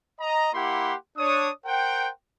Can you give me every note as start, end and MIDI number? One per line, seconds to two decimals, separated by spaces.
0.20 0.49 75
0.20 0.49 82
0.53 0.94 58
0.53 0.94 64
0.53 0.94 67
0.53 0.94 78
0.53 0.94 83
0.53 0.94 84
1.17 1.50 62
1.17 1.50 73
1.17 1.50 87
1.66 2.09 70
1.66 2.09 72
1.66 2.09 78
1.66 2.09 79